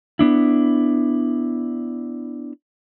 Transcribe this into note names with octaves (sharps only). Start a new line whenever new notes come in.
B3 D4 E4